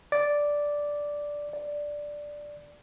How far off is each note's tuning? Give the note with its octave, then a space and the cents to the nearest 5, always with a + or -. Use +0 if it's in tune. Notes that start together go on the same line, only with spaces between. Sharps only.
D5 -5
D5 +0